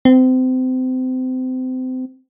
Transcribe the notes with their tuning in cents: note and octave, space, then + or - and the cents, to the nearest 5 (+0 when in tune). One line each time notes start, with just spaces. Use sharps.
C4 -30